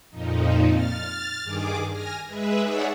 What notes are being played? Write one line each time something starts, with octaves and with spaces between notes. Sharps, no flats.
F2 A#2 F3 D#4
F6 A6
G2 D#3 G#4 D6
G#5 F6 A#6
G#3 G#4 B4 E5
D#4 G#4 C#5 D5 E5 F#5